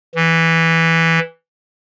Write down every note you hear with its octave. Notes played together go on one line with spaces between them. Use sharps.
E3